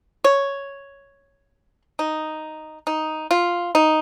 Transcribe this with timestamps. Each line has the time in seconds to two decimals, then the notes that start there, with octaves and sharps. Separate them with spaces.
0.24 C#5
1.99 D#4
2.87 D#4
3.31 F4
3.75 D#4